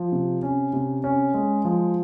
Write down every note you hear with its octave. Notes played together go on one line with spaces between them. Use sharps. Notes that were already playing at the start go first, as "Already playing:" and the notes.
Already playing: F3
C3
C#4
C3
C#4
G#3
F3